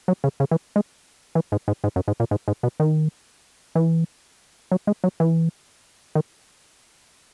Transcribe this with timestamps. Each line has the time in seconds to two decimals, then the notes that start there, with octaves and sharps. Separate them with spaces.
0.08 F#3
0.24 C#3
0.40 C#3
0.51 E3
0.76 G#3
1.35 E3
1.52 G#2
1.68 G#2
1.84 G#2
1.96 F#2
2.08 G#2
2.20 A#2
2.31 G#2
2.48 G#2
2.63 B2
2.80 D#3
3.75 E3
4.71 F#3
4.87 G#3
5.04 F#3
5.20 E3
6.15 D#3